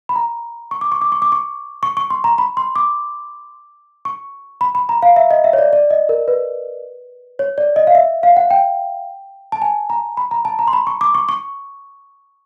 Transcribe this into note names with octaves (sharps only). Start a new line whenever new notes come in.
B5
A#5
C#6
D6
C#6
D6
C#6
D6
C#6
C#6
C#6
C6
A#5
B5
C6
D6
C#6
B5
B5
A#5
F5
E5
D#5
E5
C#5
D5
D5
D#5
A#4
B4
C#5
D5
D#5
F5
E5
F5
F#5
G5
A5
G#5
A#5
B5
A#5
A5
A#5
C6
B5
C#6
D6
C#6
C#6